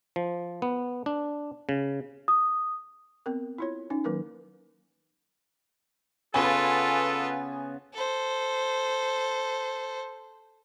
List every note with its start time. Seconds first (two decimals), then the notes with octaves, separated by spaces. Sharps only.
0.16 F3
0.62 B3
1.06 D4
1.69 C#3
2.28 D#6
3.26 B3 C4 A#4
3.58 E4 F4 C#5
3.90 C#4 D#4
4.04 D#3 F#3 A#3 A#4 B4
6.34 C#3 B3 F4 A4 B4 G#5 C#6
7.94 A4 C5